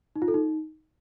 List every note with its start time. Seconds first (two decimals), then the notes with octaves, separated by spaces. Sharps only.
0.16 D#4
0.22 F4
0.28 A4
0.34 D#4